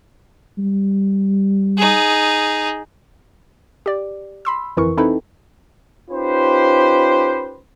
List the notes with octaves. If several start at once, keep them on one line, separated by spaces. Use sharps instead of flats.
G3
D#4 G#4
G4 D5
B5 C6 E6
G1 F2 E3 E4 A#4 C#6
C4 D#4 E4 A4 B4 G5
C#4 D#4 F4 G4 B4 C5